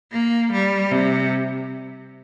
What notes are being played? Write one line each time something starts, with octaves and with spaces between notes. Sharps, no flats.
A#3
G3
C3